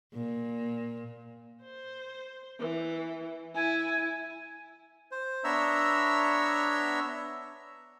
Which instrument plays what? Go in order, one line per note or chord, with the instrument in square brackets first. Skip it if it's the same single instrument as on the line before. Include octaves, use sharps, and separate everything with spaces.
[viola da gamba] A#2
[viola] C5
E3
[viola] E4 [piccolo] G#5
[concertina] C5
B3 D4 C#5 E5 A#5 E6